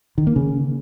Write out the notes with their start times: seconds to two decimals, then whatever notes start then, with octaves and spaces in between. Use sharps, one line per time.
0.18 D#3
0.27 A#3
0.36 C#3